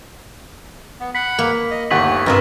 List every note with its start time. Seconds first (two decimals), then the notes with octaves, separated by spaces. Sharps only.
1.00 B3
1.15 F#5 B5 B6
1.39 A#3
1.71 D#5
1.91 G1 D#2 A3 F#5 C#6 B6 F#7
2.26 G2 C3 F4 A#4 D#5 E5